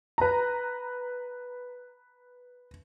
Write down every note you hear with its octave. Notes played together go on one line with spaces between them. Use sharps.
B4 A#5